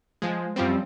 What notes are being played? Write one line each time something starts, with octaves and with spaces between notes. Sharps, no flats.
F3 G#3
F#2 F3 G3 C4